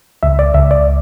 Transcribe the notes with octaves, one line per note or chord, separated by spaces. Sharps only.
C#2 E5
D5
C#2 E5
D5